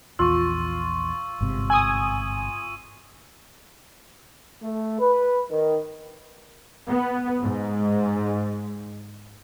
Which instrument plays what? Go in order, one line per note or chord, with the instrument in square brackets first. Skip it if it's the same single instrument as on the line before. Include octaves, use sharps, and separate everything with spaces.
[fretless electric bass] A#1 E2 [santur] F4 [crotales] C#6 E6
[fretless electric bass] G1 G#2 C3
[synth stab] G#5 D#6 [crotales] E6 D#7
[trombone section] A3
B4
D#3
[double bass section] B3
G#2